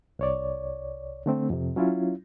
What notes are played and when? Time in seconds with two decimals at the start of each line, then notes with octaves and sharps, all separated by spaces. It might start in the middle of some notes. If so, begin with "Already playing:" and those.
0.19 C2 C#5 D5
1.26 D3 A3 C4
1.50 F2 C3
1.76 F#3 C#4 E4 F4